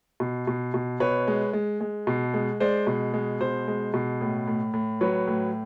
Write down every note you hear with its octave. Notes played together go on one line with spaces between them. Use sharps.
B2
B2
B2
B2 B4 C#5
G#3
G#3
G#3
B2
G#3
G#3 C5 D5
B2
G#3
B2 C5
G#3
B2
A2
A2
A2
F#3 B4 C#5
A2